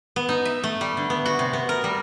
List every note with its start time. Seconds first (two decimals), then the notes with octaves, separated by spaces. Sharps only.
0.16 B3
0.29 D#4
0.45 E5
0.64 A3
0.81 G3
0.97 D3
1.10 B3
1.26 F#4
1.39 C3
1.53 B3
1.69 A#4
1.84 G3